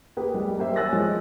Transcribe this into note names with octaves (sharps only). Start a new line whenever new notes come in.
A#3 G4 G#4 B4
G3 G#3 G4
G3 A#3 C5 E5
C#5 G#5 E6 F#6 A6 A#6
F3 G#3